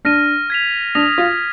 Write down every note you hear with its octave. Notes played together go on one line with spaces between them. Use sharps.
D4 F6 A#6 D#7
G#6 B6 F7
D4 D#6 A#6 F7
F4